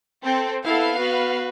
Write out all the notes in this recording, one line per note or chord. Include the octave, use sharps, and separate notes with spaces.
C4 A4
B3 E4 A4 F5
F#4 B4